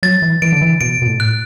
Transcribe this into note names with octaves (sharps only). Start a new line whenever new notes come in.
F#3 A6
E3
E3 D7
D3
E3
B2 D7
B2
A2
F#6